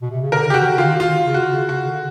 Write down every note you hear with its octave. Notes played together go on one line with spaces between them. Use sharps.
B2
C3
C#3
D3 A#4
C#3 G4
F#4
D#3
D3
F4
D#3
F4
C#3
F#4
C#3
C#3 F#4
D3